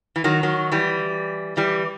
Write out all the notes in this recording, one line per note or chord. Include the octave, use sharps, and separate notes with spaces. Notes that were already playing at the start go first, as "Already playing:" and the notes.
E3
D#3 F#3
D#3 F#3
E3 G3
E3 G3